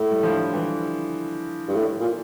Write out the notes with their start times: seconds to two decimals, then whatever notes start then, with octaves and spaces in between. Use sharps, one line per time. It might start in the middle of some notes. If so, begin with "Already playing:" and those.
Already playing: A2
0.11 G3
0.23 D3 F3
0.54 E3 G3
1.68 G2
1.77 A2
2.00 A#2